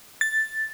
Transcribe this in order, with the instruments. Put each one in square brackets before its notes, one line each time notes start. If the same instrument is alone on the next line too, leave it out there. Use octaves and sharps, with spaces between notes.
[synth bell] A6